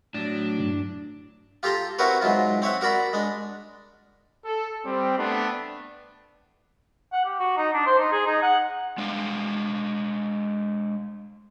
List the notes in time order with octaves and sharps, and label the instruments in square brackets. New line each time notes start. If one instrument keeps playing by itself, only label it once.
[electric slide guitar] A2 F#3 [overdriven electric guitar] D4
[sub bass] G2
[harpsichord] F4 G4 A4 A#5 C6
C4 E4 F#4 A#4 B4 C#5
G#2 E3 F#3 F4
C4 C#5 E5 F#5
F#4 A#4 D5 B5
G#3 D4
[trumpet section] A4
G3 C4
A3 B3 D4
[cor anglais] F#5
G4
F#4
D#4
D4
C5
D#4
G#4
D#4
F#5
[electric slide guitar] G#3 D4 F5